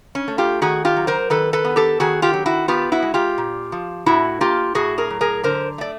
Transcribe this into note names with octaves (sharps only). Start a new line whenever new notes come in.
C#4
A3
F4 G4
D#3 F#4 G#4
F4 G4
F#3
A#4 C5
D#3 A4 B4
A4 B4
B3
G4 A4
D#3 F#4 G#4
F4 G4
F#3
E4 F#4
B3 F4 G4
E4 F#4
G#3
F4 G4
A#2
F3
A2 E4 F#4
A#3 F4 G4
A2 F#4 G#4
G#4 A#4
F#3
G#4 A#4
D3 A#4 C5
A3 D5